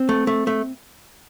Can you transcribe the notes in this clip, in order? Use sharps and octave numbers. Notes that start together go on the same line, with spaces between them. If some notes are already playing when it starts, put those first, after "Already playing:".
Already playing: C4
A3
A3
A3